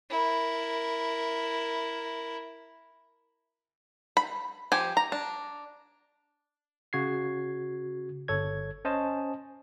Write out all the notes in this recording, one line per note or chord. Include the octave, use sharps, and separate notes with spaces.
E4 A#4
B5
F3 G4 G#5
A#5
D4
C#3 F#4 G#6 C7
G1 A4 C#5 G#6
C#4 C5 D#5 G#5 A5